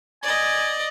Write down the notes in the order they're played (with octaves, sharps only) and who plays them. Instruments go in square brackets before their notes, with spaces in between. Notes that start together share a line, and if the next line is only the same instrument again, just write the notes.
[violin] D5 D#5 [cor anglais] G#5